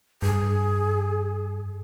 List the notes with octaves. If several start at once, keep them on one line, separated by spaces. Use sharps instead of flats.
G2 G#4